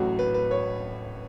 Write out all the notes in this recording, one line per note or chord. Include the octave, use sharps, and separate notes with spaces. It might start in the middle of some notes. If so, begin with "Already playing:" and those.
Already playing: A1 A2 F#3 F#4
B4
B4
C#5